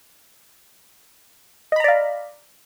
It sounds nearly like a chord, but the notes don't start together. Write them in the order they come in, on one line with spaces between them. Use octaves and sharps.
D#5 B5 A#5 D5 F5